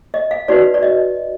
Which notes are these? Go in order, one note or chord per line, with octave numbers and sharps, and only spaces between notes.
D#5
F5
D#4 F#4 B4 D5
D5
D#5